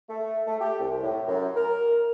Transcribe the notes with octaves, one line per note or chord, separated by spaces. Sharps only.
A3
A3
G4
C2
A2
F#2
A#4